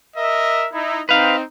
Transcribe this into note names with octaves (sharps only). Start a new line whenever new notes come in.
A#4 D#5 E5
D#4 E4
C4 D#4 B4 F5